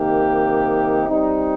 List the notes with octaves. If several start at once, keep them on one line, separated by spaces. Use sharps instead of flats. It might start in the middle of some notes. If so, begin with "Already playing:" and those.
Already playing: C3 D#3 A#3 D#4 G4
G3 C4 D#4